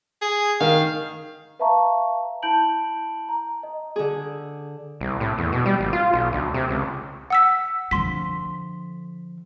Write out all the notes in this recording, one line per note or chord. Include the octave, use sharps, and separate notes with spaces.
G#4
D#3 F5
B4 E5 F5 A5 A#5 C#6
E4 A5 B5 G6 D7 F#7
A#5
D#5
D3 G#4
C2
A2
E2
B2
G3
G#1
F4
B1
D2
C3
C#2
F#5 E6 B6
D3 F3 C6 B6